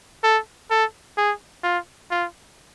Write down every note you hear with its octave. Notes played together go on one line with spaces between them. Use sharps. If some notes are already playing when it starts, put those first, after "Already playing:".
A4
A4
G#4
F4
F4